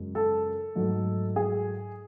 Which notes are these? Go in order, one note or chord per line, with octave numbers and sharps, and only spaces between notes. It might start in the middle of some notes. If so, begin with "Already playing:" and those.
Already playing: F#2 C#3 G#3
A4
G#2 F#3 A3
G#4